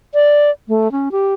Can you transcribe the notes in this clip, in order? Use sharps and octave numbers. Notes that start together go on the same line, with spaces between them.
D5
A3
C#4
G4